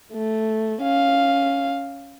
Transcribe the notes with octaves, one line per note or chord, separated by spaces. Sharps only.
A3
C#4 F5